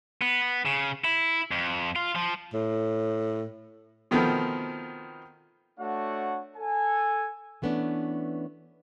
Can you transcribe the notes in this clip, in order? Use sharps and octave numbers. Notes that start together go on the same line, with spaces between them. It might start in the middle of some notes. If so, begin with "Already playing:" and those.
B3
C#3
E4
F2
F4
F3
A2
B2 D#3 F3 A3 B3 C4
A3 D4 F#4 C#5 F#5
A4 G#5
E3 A3 B3 C#4 D4